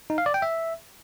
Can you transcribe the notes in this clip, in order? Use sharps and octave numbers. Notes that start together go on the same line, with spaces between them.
D#4
F5
D5
G5
E5